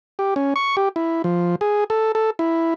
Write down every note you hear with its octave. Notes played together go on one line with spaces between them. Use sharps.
G4
C#4
C#6
G4
E4
F3
G#4
A4
A4
E4